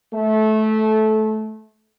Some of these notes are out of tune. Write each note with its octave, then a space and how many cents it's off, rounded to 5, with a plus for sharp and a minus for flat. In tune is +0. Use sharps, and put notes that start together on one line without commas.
A3 -20